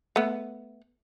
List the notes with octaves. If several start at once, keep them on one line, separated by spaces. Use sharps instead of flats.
A3 B3